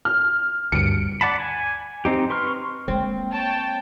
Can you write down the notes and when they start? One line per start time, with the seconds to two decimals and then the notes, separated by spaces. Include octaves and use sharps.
0.05 F6
0.72 D2 G2 C#7 D7
1.21 D5 F#5 A5 B5
1.40 G#5
2.05 C4 D#4 G4
2.30 B4 C6 C#6 F6
2.88 G#3 A#3 C4
3.32 C#5 G5 A5